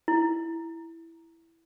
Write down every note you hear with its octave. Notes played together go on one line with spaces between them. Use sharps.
E4